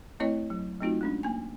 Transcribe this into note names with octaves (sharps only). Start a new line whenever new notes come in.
A3 C4 E4 C#5 D#5
F#3
F#3 A3 C4 D#4 F4 F#4
G#3 C#4 D4
A#3 G#5